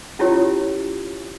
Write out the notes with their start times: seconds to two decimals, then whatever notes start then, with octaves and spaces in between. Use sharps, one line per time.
0.19 C#4 E4 F4 G4 C#5